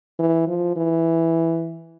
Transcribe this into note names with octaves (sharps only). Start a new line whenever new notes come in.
E3
F3
E3